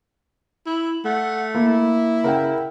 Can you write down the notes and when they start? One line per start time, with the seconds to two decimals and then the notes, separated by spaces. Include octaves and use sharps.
0.66 E4
1.05 A3 F#5
1.55 A#3 E4
2.24 C#3 A#4 F#5 G5